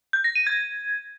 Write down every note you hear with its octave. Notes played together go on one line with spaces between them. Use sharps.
G6
A#6
D#7
G#6